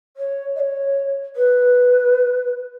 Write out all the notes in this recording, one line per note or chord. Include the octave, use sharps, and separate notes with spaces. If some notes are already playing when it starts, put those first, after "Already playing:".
C#5
D#5
C#5
B4